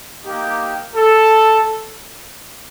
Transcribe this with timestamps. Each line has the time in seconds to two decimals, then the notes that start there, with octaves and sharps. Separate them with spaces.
0.25 A#3 D#4 G4
0.96 A4